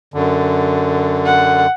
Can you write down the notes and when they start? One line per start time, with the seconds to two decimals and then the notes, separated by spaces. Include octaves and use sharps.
0.14 F#2 D3
1.26 F#5